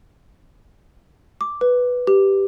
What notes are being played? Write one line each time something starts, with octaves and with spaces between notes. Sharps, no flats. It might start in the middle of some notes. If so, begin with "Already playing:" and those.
D6
B4
G4